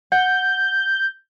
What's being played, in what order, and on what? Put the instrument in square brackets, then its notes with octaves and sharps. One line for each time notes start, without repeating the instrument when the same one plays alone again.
[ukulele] F#5 [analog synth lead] G6